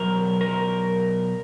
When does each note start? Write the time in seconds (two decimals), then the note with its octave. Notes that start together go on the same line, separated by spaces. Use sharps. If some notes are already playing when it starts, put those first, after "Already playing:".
Already playing: B2 F#3 A#4
0.41 A#4